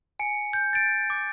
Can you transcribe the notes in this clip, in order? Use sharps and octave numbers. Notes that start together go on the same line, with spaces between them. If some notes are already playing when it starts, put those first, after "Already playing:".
G#5 C#7
G6
A6 D7
D6